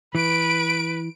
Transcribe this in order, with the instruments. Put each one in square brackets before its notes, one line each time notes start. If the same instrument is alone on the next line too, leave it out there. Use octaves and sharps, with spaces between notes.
[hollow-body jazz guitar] E3 [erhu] B4 [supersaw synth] D7